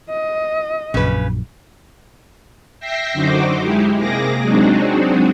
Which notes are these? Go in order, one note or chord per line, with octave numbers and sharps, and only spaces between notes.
D#5
A#1 F#2 C#3 B4
E5 G5 A#6 C7
F#2 D3 D#4 F#4 C5 D6
G#3 D#4 E4 G4
C3 A#3 G#4 D6 A#6
F#3 G#3 C4 D4 D#4 F#4